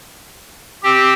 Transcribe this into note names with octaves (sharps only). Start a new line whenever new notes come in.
C4 G4